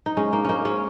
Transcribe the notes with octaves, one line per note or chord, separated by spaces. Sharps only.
D#4
G#3 C#4
A#3 D#4
A#3 C#4 D#4
G#3 C#4